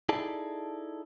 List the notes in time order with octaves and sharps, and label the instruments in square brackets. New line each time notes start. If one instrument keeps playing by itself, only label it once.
[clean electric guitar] D#4 E4 G#4 A4 D5 A5